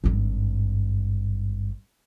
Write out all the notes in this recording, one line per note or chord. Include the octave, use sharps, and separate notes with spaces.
G#1 G2